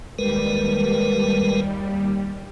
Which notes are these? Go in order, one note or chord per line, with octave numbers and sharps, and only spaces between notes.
D#2 G3 G#3 A#4 B4